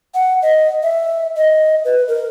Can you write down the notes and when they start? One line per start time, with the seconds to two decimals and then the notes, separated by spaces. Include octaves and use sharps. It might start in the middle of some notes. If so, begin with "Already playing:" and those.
0.14 F#5
0.42 D#5
0.83 E5
1.37 D#5
1.85 B4
2.08 A#4